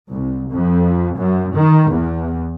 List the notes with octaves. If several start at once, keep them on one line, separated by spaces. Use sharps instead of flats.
C2
F2
F#2
D#3
E2